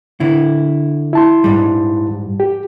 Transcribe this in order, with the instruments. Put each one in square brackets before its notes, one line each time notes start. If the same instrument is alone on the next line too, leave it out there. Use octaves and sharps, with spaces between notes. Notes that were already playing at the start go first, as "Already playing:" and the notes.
[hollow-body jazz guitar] D3 E4
[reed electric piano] E4 A5 C6
[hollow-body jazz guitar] G#2 G3
[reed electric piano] G4